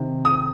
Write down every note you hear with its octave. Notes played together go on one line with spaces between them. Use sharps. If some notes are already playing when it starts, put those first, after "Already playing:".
Already playing: C3 D#3
D#6